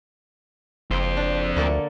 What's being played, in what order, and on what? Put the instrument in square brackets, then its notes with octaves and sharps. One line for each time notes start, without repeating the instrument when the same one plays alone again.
[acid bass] F#1 [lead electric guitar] F2 C5
[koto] D4
[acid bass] D2 [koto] D3 A#3 A4